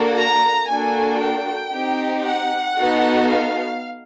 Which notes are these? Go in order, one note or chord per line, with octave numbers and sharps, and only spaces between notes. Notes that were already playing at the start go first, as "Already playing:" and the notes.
Already playing: A#3 D4 F#4 A4
A#5
A#3 D4 F#4 A4 G#5
G5
C4 D#4 G4
F#5
B3 D#4 F#4 A4
F5